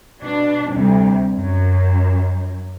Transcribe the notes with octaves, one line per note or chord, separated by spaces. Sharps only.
B2 D4
D2 C3 G3
F#2